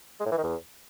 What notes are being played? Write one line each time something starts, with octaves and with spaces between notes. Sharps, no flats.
G#3
A2
E3
D#3
E2